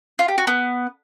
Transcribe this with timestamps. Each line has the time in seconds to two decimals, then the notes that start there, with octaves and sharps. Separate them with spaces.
0.19 F4
0.28 G4
0.38 F#4
0.47 B3